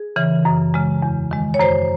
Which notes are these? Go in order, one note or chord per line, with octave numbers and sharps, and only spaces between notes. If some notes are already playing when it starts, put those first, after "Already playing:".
Already playing: G#4
C#3 E3
F#2
C#3 G#3
E2
D#3 G#3
C#5
F#2 C5